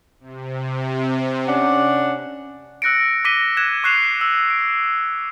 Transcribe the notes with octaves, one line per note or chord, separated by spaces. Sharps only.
C3
C#4 D4 F#5
E6 F#6 A#6 C#7 D7
D6 A#6 B6 D#7 G7
F#6 G#6 E7
C#6 F#6 C7 E7 F7
E6
D7